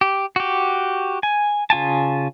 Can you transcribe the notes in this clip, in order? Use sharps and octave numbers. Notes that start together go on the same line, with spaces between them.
G4
F#4 G4
G#5
C#3 F4 G#5 A5